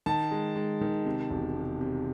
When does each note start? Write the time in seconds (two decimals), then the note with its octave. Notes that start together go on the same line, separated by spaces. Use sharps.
0.06 D#3 A5
0.31 G#3
0.56 G#3
0.81 D#3
1.06 C3
1.31 E1
1.56 C3
1.81 C3